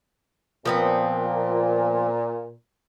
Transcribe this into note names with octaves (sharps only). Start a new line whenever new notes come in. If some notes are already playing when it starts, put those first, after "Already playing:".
A#2 F3 B3 C4